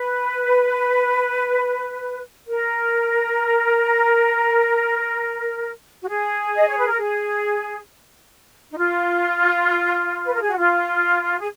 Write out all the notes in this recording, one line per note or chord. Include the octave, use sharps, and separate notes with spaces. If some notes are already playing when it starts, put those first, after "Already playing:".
Already playing: B4
A#4
F#4
G#4
D#5
C#5
B4
A#4
G#4
D#4
F4
B4
A#4
G#4
F#4
F4
G#4